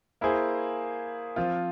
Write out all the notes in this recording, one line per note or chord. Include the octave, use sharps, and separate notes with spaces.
A#3 E4 G#4 C5
F3 C4 F4